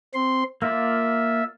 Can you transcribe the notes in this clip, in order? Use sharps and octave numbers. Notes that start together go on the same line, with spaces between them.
C4 C6
A#3 F4 D5 E5